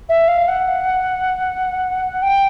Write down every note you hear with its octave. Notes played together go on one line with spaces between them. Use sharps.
E5
F5
F#5
G5